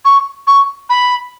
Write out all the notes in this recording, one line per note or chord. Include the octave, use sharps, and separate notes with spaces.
C#6
C#6
B5